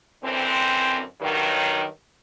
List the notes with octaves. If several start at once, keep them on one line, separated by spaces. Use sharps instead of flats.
F#2 D3 E3 C4
G2 D#3 F#3